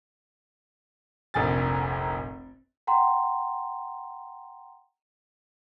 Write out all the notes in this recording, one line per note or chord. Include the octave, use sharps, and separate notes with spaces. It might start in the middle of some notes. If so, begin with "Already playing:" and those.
F1 A#1 G#5 A6
F#5 G5 A#5 C6